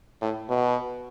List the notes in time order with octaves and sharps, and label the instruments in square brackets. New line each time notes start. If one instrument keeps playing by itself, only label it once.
[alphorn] A2
B2